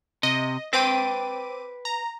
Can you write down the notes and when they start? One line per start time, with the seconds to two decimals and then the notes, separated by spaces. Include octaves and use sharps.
0.23 C3 D#5
0.73 C4 B4 G5 D6 D#7
1.85 A#5